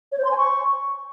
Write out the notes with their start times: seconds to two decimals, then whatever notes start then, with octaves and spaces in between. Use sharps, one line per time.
0.12 C#5
0.18 C5
0.25 C6
0.31 G#5
0.37 C#6